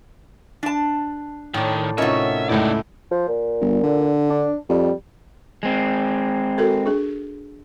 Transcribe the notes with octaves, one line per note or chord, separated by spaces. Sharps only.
D4 A5
A2 D#3 D5
C3 C#4 D#4 F4 F#4 A#4 C#5 E5
C#2 A2 D#4 E4 D5
F3
A#2
G1
D3
D4
F2 G3
G#3 C4
F#4 A4 A#4
D4 G#4